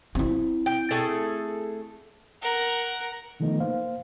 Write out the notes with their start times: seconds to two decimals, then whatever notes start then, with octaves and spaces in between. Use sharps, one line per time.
0.15 C4 E4
0.66 G5
0.91 A3 G#4 A4
2.42 A#4 F#5
3.40 C3 D#3 F3 A3 B3 D#4
3.60 A#3 C5 F5